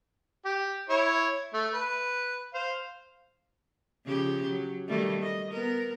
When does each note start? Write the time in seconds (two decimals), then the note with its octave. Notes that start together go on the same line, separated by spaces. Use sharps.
0.45 G4
0.89 E4 C#5
1.53 A3
1.73 B4
2.54 C5 F5
4.06 C#3 F3 G4
4.48 F#3
4.88 D#3 G3 A3
5.22 D#5
5.51 B3 A#4